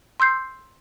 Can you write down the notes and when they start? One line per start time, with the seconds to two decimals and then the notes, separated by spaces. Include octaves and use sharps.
0.20 C6 E6 G6 C7